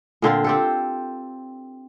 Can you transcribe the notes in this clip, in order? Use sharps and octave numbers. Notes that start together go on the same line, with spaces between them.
A#2 D3 C4 F4
C4 G4 A4